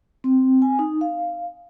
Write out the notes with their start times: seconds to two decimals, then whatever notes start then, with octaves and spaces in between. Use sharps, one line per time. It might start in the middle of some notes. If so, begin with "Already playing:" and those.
0.24 C4
0.62 G#5
0.79 D#4
1.01 F5